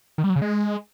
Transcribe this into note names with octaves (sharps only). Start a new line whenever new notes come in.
D#3
G3
F#3
C#3
G#3